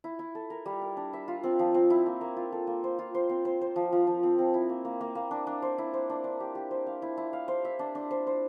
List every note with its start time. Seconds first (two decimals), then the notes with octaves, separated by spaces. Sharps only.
0.04 E4
0.19 E4
0.35 A4
0.50 A#4
0.66 G3
0.82 A#4
0.97 D4
1.13 E5
1.28 F4
1.44 C4
1.59 F3
1.75 C4
1.90 E4
2.06 A#3
2.21 A#3
2.37 F4
2.52 A4
2.67 A#3
2.84 C5
2.99 F4
3.15 C5
3.29 C4
3.45 C5
3.61 C5
3.76 F3
3.92 F3
4.07 F3
4.23 C4
4.39 C4
4.54 E4
4.69 A#3
4.85 A#3
5.01 A#3
5.15 A#3
5.31 D4
5.47 D4
5.62 C5
5.78 E4
5.94 C5
6.10 D4
6.24 D4
6.40 G4
6.55 G4
6.71 C5
6.87 F5
7.02 E4
7.17 E4
7.33 F5
7.48 C5
7.65 E5
7.79 D4
7.95 D4
8.11 C5
8.27 C5